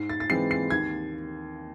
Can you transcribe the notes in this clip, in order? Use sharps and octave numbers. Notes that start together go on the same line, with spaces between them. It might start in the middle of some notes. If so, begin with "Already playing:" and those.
Already playing: G#2 C7
A6
A6
E3 G#3 C4 C7
C7
D#2 G#6